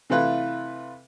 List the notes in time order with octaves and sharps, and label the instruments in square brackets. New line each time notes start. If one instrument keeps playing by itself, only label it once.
[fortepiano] C3 E3 A3 E4 F4 B4